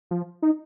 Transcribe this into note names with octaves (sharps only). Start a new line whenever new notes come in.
F3
D#4